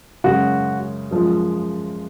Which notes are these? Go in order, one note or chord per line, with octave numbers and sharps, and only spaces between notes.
F#2 C#3 G#3 F#4
F#2 F3 G#3